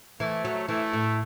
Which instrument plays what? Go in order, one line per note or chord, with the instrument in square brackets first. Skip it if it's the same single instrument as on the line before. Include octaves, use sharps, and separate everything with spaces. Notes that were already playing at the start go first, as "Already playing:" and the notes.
[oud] E3 [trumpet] A3
[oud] F#3
[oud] E3 [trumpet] A3
[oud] A2